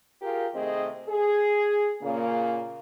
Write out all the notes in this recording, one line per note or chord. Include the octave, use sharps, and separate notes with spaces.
F4 G4 G#4 A#4
C3 D#3 A3 C4 G#4 D#5
G#4
A#2 C#3 A#3